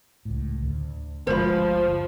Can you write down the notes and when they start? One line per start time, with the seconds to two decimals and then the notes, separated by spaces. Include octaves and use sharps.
0.25 C#2 A2
0.62 D2
1.27 G1 D2 F3 G#3 C5 B5